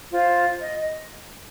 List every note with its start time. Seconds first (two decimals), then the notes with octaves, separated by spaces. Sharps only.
0.12 F4 C5
0.60 D#5